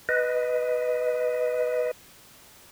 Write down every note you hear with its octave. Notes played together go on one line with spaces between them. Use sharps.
B4 D#5